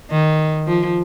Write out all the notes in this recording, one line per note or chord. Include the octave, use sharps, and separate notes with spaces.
D#3
F3